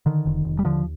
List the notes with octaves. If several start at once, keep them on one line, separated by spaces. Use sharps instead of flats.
D3 D#3
F1
F1
G3
D#2 D3 F3